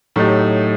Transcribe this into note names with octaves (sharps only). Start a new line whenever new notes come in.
A2 F#3 A3 D#4 G4